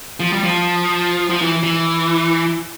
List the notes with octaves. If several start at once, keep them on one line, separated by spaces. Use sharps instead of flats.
F3
G3
F3
F3
E3
E3